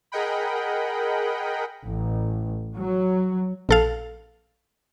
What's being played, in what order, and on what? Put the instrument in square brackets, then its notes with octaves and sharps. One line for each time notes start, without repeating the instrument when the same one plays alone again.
[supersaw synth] G#4 A#4 D#5 F#5 G5 B5
[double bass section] A1
F#3
[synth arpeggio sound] A#1 A4 F5